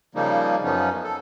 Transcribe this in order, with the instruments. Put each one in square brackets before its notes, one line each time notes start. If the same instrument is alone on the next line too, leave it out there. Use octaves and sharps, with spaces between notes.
[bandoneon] C#3 F3 G3 A#3 D#4
F#2 F3 B3 C#4 D#4
A4